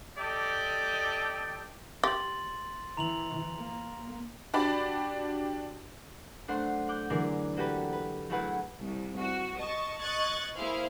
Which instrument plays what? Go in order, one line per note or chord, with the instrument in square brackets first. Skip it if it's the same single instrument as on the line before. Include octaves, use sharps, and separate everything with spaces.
[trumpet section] G4 A4 D5 D#5 G5
[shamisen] G4 [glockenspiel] C6 A6 F#7
[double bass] E3 [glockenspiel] A#5 F7 F#7
[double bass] A#3
[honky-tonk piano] D4 F#4 G4 D5 B5 D6
[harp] F#3 A3 D4 C5 F#5 C6
F#5 D6 F#6 G6
D3 E3 F#3 G#4 A#4 D5
A#3 F#4 G4 A4 B4
B4
F#3 A3 E4 G#4 B4 F#5
[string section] C2
F#4
D#5 A5 C#6
D#5 C#6 F#6 G#6 A6
A#3 E4 G#4 C5 F5